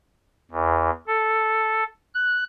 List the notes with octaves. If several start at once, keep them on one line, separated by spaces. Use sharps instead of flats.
E2
A4
F#6